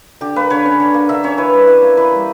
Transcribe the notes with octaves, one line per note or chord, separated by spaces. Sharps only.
D3 G4
A#3 B4
D3 C#5
C#4
D3
A#3
D3 E5
C#4 C#5
E3 B4
G3
E3
A#3
E3 B4
G3